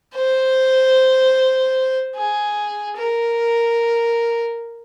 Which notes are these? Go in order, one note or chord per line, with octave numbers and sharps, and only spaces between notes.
C5
G#4
A#4